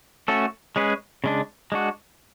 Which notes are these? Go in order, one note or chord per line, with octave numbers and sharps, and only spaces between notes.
A3 C#4 F#4 A4
G#3 C#4 G#4 B4
C#3 G#3 D4
G#3 D4 F#4